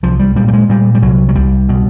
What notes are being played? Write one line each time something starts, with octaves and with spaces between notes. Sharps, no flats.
C2 F3
G3
A#2 G3
G3
G#3
A#2 G3
G3
C2 F#3
F#3
C2 G3
B2